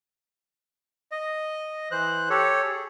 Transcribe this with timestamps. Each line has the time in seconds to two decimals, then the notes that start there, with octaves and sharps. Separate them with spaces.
1.12 D#5
1.91 E3 C5 F#6
2.30 G4 A4 C#5
2.64 G#4